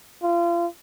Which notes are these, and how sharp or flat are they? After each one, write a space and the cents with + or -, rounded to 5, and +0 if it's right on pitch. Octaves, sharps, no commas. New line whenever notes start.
F4 -30